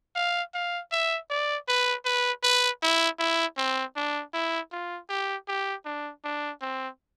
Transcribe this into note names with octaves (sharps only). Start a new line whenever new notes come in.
F5
F5
E5
D5
B4
B4
B4
E4
E4
C4
D4
E4
F4
G4
G4
D4
D4
C4